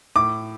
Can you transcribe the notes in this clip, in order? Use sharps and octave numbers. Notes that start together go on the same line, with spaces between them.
A2 D6